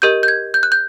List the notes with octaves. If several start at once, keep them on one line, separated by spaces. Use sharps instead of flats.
G4 A#4 D#5 G6
G6
G#6
G6
F#6
G6